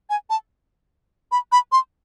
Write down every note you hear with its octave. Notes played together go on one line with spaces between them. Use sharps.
G#5
A5
B5
B5
C6